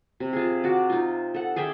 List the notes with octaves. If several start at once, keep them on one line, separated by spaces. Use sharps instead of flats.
C3
F4 G#4
F#4 D5
D#4 F4
A4 F#5
G#4 D5 E5 G5